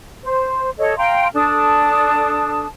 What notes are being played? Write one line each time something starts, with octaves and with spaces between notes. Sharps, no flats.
C5
A4 C#5 D#5
F5 G5 A#5 C6
D4 A4 A5 D#6